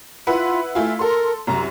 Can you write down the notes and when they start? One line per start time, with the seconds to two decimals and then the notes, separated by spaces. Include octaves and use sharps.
0.27 E4 F4 B4 F#5
0.75 A3 E4 F4 G#5
0.99 A4 A#4 C6
1.47 C2 F#2 A#5